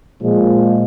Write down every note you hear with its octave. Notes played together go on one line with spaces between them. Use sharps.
A#2 F3 G#3